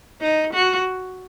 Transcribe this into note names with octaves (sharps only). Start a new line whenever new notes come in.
D#4
F#4